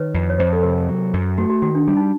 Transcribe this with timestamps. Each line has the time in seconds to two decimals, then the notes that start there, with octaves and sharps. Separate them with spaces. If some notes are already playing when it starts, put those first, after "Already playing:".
Already playing: D#3 B4 C#5
0.14 F2
0.30 C#5
0.38 F2 C5
0.53 A4
0.63 C3 A#4
0.89 F#3
1.13 F#2
1.38 A3 F#4
1.50 F#4
1.62 D#3 F#4
1.75 D4
1.88 G3 D4
1.97 D#4